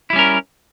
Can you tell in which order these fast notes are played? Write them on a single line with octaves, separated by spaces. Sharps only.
E4 G3 C#4 A#4